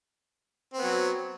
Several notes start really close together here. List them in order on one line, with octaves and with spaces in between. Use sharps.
C4 B3 F#3